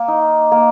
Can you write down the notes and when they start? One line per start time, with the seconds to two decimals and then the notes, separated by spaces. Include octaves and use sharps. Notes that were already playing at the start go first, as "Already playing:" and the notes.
Already playing: A#3
0.08 D#4
0.52 A#3